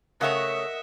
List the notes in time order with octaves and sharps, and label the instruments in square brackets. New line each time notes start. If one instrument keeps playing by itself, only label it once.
[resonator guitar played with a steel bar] C#3 A3 C#5 [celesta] A#4 D#6 [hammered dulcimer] D#5 F#5 [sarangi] E5